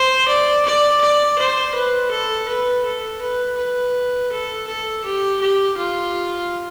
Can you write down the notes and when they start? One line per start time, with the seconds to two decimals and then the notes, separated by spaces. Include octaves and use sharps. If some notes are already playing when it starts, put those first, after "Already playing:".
Already playing: C5
0.28 D5
0.65 D5
1.01 D5
1.38 C5
1.74 B4
2.11 A4
2.48 B4
2.85 A4
3.21 B4
3.57 B4
4.31 A4
4.67 A4
5.04 G4
5.40 G4
5.77 F4